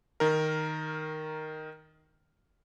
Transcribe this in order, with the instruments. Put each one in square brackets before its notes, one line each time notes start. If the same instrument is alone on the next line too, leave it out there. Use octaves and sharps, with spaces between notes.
[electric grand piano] D#3 A#4